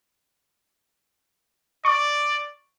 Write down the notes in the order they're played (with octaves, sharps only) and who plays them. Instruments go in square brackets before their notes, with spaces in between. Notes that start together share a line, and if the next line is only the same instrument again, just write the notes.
[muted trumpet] D5 [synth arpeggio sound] C#6 D6